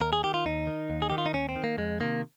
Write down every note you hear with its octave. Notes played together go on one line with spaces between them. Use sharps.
D#2 A#4
G#4
D#3 G4
F4
D#2 D#4
D#3
D#2
G#4
D#3 G4
F4
D#4
D#2 C#4
C4
D#3
A#3
F2 G#3
C3 D#3 A#3